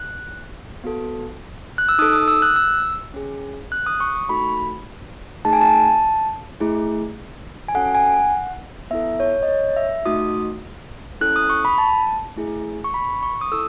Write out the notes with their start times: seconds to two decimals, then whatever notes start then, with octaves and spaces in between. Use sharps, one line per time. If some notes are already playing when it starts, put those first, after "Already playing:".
Already playing: F#6
0.84 B3 F#4 A4
1.78 F#6
1.89 E6
1.99 D#4 D#6
2.02 A4
2.13 D#6
2.28 E6
2.42 F#6
2.56 E6
3.14 C#4 G#4
3.72 F#6
3.86 D#6
4.00 C#6
4.15 C#6
4.29 A3 D#4 F#4 A4 B5
5.45 A3 D#4 G#4 A5
5.53 G#5
5.61 A5
6.60 A3 E4 G#4
7.68 G#5
7.75 C#4 F#4 A4 F#5
7.95 G#5
8.14 F#5
8.91 B3 E4 A4 E5
9.20 C#5
9.43 D#5
9.49 C#5
9.76 E5
10.06 A3 D#4 F#4 D#6
11.21 C#4 E4 A4 F#6
11.36 D#6
11.50 C#6
11.65 B5
11.78 A5
12.36 A3 E4 G#4
12.84 C#6
12.94 B5
13.23 C#6
13.41 D#6
13.52 E4 A4 E6